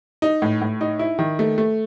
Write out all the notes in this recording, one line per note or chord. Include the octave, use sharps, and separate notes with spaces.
D#4
A2
A2
D#4
E4
D#3
A3
A3